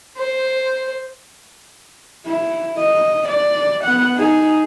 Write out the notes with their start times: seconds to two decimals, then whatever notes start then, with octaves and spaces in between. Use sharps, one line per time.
0.18 C5
2.26 E4
2.78 D#5
3.29 D5
3.84 B3 F#5
4.16 D#4 G#4